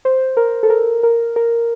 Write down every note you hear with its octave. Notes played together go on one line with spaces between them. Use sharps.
C5
A#4
A4
A#4
A#4
A#4